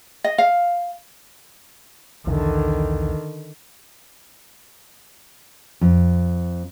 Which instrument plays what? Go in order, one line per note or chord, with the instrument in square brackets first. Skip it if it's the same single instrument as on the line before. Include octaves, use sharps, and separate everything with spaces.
[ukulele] D#5
F5
[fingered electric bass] B1 E2 [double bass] D3 D#3
[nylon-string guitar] F2